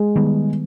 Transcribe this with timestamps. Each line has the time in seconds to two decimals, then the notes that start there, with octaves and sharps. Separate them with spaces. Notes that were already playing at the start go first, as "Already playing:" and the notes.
Already playing: G#3
0.16 D#3 G3 B3